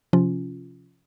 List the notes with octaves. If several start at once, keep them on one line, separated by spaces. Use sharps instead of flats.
C3 F3 C#4 F4